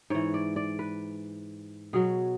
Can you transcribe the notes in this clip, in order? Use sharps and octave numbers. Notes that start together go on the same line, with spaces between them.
G#2 E3 C#5
D5
D5
B4
B2 F#3 G#4